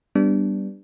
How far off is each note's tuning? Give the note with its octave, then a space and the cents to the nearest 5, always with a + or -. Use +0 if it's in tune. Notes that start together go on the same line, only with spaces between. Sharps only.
G3 +0 B3 +0 D4 +0